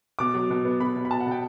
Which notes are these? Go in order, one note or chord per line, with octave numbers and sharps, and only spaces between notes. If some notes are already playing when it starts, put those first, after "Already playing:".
B2 D6
F#3
B2
B3
B2 B5
B2
B5
B2 A5
F#5
B2 G5